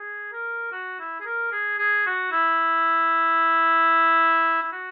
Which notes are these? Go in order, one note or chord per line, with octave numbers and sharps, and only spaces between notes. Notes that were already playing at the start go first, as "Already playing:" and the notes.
Already playing: G#4
A#4
F#4
E4
G#4
A#4
G#4
G#4
F#4
E4
E4
F#4